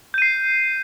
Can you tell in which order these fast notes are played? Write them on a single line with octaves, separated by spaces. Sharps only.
G6 D#7 C7